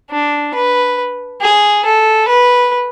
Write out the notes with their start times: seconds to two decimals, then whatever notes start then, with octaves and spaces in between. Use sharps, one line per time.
0.11 D4
0.54 B4
1.42 G#4
1.85 A4
2.28 B4